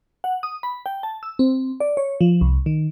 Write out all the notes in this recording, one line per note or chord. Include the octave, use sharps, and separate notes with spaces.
F#5
D#6
B5
G5
A5
E6
C4
D5
C#5
F3
C2
D#3